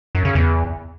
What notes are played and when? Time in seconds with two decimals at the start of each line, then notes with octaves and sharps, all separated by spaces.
0.15 F#2
0.25 C#3
0.35 E2